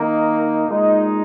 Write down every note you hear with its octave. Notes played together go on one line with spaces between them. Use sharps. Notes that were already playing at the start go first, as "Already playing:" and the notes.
Already playing: D#3 A#3 D#4
A#2 G#3 D#4